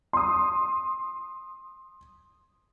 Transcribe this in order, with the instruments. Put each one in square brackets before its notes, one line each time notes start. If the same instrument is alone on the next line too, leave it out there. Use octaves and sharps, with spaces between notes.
[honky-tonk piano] C6 D#6